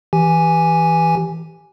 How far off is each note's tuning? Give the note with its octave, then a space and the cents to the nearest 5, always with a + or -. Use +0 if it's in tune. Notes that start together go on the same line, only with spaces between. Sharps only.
E3 -10 G4 +0 G#5 +0